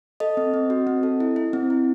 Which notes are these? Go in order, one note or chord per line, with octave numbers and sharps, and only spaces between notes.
A4 D#5
C4
C4
F#4
C4
A4
E4
E4
C4
E4